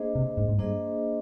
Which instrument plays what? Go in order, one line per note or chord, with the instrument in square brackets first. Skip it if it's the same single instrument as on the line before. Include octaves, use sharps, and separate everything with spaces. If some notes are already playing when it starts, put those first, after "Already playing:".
Already playing: [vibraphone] A#3 D4 G#4 C5 D#5
[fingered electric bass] C3
G#2
G#2
[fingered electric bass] G2 [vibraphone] A#3 D4 G#4 C5 D#5